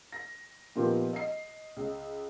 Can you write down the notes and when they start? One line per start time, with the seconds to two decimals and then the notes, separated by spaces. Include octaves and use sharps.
0.12 A#6
0.76 A#2 D#3 F3 B3 F4 G4
1.13 D#5 C7
1.76 C#2